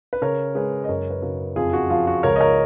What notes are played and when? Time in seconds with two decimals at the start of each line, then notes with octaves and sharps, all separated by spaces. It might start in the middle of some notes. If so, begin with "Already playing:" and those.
0.13 B4
0.22 C#3 A#4 C#5
0.55 G#3 G#4 B4
0.84 D#5
0.89 F#2 A#4 C#5
1.10 B4
1.22 C#3 F#4 A#4
1.56 F2 F4 G#4
1.73 F#4
1.90 F3 F4
2.07 F#4
2.23 C#2 A#4 C#5
2.36 D#5
2.41 A#4 C#5